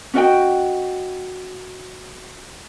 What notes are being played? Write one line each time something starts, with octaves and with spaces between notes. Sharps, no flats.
C#4 F#4 D#5 G5